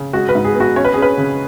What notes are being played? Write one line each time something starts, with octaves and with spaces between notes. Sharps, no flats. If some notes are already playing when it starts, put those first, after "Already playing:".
Already playing: C#3
G#3 F#4
B4
G#2
G#4
B3
F#4
C#4 C#5
B4
C#4 G#4
B4
C#3